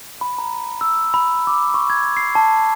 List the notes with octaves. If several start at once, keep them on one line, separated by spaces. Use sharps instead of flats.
B5
A#5
E6
B5
D6
C#6
G#6
C7
A5